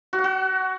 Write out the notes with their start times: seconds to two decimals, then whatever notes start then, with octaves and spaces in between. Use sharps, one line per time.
0.13 F#4
0.19 F#5
0.24 F#4